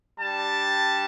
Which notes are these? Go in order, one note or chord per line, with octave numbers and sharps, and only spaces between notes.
G3 D4 G4 A5